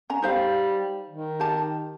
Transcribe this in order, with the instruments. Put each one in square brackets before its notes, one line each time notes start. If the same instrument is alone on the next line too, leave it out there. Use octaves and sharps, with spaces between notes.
[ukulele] C#4 A#5
[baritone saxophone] G3 [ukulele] D#4 C5 F5
[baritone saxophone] D#3
[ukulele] G4 A5